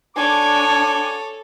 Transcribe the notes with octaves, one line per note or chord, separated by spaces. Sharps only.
D4 F#4 A4 C#5 G#5 B5 D6